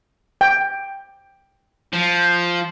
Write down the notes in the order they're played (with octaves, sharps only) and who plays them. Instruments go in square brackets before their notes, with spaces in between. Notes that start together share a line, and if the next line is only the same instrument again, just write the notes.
[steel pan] G5
[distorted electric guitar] F3